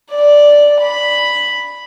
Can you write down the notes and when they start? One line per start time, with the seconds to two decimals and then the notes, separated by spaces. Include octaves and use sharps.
0.10 D5
0.81 B5